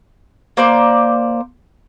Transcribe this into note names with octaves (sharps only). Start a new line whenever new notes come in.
A#3 C5 D5